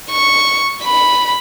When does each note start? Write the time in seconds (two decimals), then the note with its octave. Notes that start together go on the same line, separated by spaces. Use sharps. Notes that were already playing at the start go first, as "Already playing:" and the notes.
0.11 C#6
0.84 B5